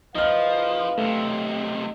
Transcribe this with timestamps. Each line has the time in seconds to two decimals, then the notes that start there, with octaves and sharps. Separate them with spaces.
0.15 F#1 F3 D#4 B4 F5 F6
0.98 B1 C3 A3